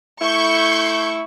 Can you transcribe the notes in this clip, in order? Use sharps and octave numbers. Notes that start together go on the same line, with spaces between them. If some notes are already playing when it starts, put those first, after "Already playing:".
A3 E4 C#6 G6